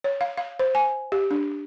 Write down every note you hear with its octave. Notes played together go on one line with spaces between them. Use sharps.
C#5
F5
F5
C5
G#5
G4
D4